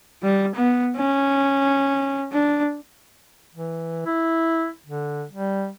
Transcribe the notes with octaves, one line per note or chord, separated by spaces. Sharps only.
G3
B3
C#4
D4
E3
E4
D3
G3